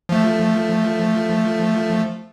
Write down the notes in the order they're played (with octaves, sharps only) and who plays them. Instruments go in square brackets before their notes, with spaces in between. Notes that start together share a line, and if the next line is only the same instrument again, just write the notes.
[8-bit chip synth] F3 A3